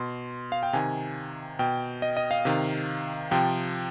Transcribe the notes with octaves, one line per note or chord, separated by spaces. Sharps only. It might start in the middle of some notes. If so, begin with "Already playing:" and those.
Already playing: B2 C6
F5
G5
C3 D#3 G#5
B2 G5
D#5
D#5
F5
C3 D#3
C3 F3 G5